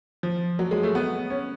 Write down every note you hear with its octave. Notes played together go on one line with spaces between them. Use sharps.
F3
F#3
G#3
A3
B3
C#4